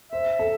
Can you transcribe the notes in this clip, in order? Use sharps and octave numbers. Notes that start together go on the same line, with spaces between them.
C5 E5
A4